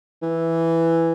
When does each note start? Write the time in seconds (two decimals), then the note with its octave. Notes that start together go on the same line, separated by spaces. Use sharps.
0.22 E3